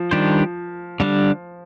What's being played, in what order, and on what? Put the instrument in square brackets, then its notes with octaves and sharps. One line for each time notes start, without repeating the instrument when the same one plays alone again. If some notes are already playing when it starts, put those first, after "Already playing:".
Already playing: [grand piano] F3
[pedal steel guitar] D#3 G3 D4 G4 C5
D3 G3 D4